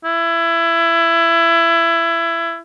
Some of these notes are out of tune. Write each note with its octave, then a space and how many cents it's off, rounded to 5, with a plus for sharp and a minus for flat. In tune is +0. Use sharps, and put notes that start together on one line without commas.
E4 +20